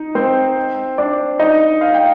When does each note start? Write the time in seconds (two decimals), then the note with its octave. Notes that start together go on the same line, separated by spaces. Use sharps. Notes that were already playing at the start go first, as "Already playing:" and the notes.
Already playing: D#4
0.15 C4 C5
0.98 D4 D5
1.39 D#4 D#5
1.81 F5
1.94 G5